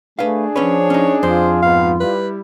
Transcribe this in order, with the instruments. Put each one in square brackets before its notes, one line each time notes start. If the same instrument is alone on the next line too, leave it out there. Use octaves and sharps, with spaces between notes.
[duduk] A3 [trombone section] D4 G#4 [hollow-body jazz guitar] B4 F5
[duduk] F3 [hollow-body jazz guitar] C#4 B4 [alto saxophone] C#5
[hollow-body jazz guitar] C#4 D#4
[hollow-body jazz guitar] F2 [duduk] F4 [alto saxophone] C5
[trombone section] G#2 B3 [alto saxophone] F5
[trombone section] G3 E4 [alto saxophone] B4